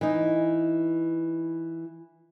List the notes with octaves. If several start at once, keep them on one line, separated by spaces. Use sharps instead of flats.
E3 D#4